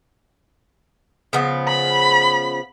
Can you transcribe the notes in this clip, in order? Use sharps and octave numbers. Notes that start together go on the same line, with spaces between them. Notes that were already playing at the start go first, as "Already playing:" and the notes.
C#3 F3 B3
B5